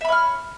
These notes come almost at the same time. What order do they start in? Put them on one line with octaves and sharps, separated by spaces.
E5 B5 C#5 F6